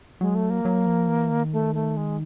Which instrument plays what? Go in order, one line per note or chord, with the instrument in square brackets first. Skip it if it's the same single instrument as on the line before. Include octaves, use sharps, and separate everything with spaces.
[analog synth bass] F#3 [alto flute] G#3
[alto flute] A3
A#3
[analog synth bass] F#3
F3
E3
D#3
[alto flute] A3
A3
G#3